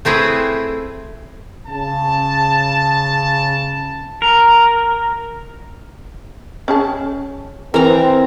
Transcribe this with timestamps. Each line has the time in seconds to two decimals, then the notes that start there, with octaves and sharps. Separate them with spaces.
0.05 A3 C4 E4 G#4 B4
1.68 C#3 A5
4.22 A#4
6.68 C#4 G#4 A5
7.74 E3 C4 A#4 A#5